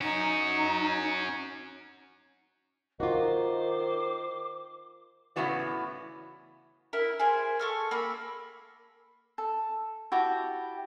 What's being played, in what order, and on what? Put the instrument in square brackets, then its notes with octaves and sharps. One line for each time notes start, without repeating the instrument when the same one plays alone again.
[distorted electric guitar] C#4 F#4 [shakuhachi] D#4
[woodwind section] D#3 [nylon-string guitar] F4 F#4 [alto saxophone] C5 [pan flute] D6
[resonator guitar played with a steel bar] A2 C#3 E3 B3 F#4 D5
[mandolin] E4 A#4
G#4 A#4 C5
A4 C#6 F6
A#3 G#4 B5 E6
[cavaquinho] A4
E4 F#4 G4 A5